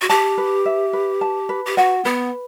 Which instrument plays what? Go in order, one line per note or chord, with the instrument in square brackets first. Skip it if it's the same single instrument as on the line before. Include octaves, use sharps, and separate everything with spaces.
[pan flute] F#4
[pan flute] G4 [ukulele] A5
[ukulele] B4
E5
B4
A5
B4
[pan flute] G4
[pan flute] F#4 [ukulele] F#5
[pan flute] B3 [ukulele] B4